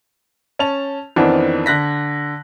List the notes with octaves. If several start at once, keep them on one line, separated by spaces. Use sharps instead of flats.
C#4 A5 F7
F2 D#3 E3 B3 C4 D4
D3 F#6 A#6 B6